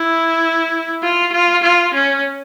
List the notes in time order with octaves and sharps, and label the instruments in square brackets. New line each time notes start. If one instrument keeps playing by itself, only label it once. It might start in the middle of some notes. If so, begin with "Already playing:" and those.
Already playing: [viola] E4
F4
F4
F4
C#4